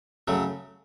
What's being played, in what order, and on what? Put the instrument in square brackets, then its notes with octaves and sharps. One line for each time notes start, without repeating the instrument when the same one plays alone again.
[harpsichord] C#3 F#3 A3